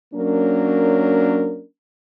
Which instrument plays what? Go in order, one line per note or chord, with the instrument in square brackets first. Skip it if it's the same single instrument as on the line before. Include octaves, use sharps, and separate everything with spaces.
[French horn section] F#3 A#3 C#4 D4 A#4